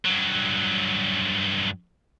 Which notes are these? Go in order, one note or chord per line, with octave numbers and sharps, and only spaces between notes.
G2 F#3